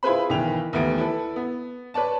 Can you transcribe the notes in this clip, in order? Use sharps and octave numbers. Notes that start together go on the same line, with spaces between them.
E4 F4 G#4 B4 C5 B5
B1 D#3 E3 G5 F7
D#2 E3 A3 B3 D7
E4 A4 B4
B3
B4 C#5 D5 A5